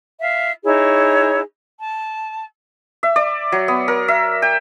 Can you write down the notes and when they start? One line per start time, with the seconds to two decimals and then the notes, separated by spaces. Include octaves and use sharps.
0.20 E5 F5
0.64 D#4 E4 G#4 C#5
1.78 A5
3.03 E5
3.16 D5
3.52 F#3
3.68 B3
3.88 A#4
4.08 E5
4.42 G5